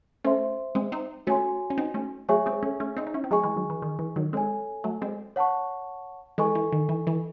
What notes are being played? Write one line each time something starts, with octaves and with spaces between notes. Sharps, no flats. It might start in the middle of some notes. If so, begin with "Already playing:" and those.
A3 C#4 C5 E5 C6
G#3 C4
C4 D#4
A3 C#4 F#4 C#5 G#5 C6
C#4
C4 D#4
A3 C#4
F#3 A3 G#4 C#5 E5 G#5 C#6
G#3 C4
A3 C#4
A3 C#4
C4 D#4
D#4
C#4 E4
C4
F#3 A3 G#4 D#5 G#5 C#6
E3 G#3
D#3 F#3
E3
D#3
E3
D#3 F#3
G#3 C4 A4 C#5 G#5
F#3 A3
G#3 C4
C#5 F#5 A5 C#6
E3 G#3 A4 D#5 G#5 C#6
E3
D#3
E3
E3